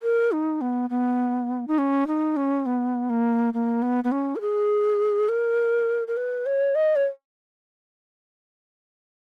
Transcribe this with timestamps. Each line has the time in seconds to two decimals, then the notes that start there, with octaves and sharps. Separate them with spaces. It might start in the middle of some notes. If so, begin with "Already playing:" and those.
0.03 A#4
0.32 D#4
0.61 B3
0.90 B3
1.68 D#4
1.78 C#4
2.07 D#4
2.36 C#4
2.66 B3
3.10 A#3
3.54 A#3
3.82 B3
4.04 B3
4.12 C#4
4.36 A#4
4.41 G#4
5.29 A#4
6.07 A#4
6.17 B4
6.46 C#5
6.75 D#5
6.96 C#5